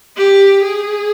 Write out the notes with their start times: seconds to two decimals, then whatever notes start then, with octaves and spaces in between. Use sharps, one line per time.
0.17 G4
0.62 G#4